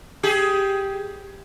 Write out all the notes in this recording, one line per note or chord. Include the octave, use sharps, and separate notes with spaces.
G4 G#4